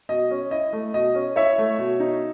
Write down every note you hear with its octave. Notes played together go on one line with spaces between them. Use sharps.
B2 D#5
C#4
E4 D#5
A3
B2 D#5
C#4
E4 C#5 E5
A3
B2
D#4